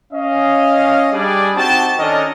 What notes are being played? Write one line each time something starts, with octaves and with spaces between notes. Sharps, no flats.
C#4 D#5 F5
G3 D4 G#4 D5
C4 D#4 F#4 G4 G5 A5
D#3 C#4 D4 A4 A#4 D#5